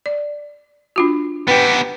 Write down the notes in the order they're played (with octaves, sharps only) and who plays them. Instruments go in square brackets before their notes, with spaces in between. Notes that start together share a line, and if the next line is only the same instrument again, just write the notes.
[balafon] D5
D4 F4 F#4
[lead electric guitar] B3 G4 [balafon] B4 G5